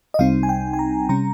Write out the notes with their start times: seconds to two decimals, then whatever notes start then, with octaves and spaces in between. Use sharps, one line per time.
0.14 D#5
0.19 C2 C3 G3 C4 D#4 F5
0.43 G#5
0.49 G5
0.74 G#5
0.79 A#5
1.09 C3 G3 C#4 A#5